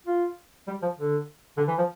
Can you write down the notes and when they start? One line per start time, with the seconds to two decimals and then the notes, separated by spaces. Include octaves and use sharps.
0.07 F4
0.68 G3
0.82 F3
0.98 D3
1.58 D3
1.68 E3
1.78 F3